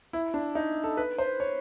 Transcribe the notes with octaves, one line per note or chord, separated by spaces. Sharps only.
E4
D4
D#4
A4
B4
C5
C#5